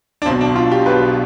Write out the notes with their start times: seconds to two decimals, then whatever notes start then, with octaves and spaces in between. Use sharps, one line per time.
0.22 D4
0.26 B1 B2 C4
0.41 D4
0.56 F4
0.71 G4
0.86 B1 B2 B4